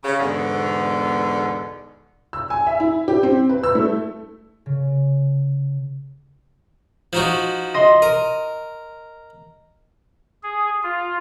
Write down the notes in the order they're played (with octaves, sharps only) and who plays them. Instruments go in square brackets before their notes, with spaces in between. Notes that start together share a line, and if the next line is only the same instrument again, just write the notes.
[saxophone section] C#3
E2 G#2 B2 D3
[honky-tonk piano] E6
G#5
E5
E4
G4
C4
B4
E6
A3
[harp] C#3
[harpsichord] F3 D#4 F#4 [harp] G6
[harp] D#5 C6
[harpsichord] A#4 [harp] D#7
[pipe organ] G#4
F4